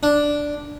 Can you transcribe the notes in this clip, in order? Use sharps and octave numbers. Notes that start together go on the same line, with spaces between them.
D4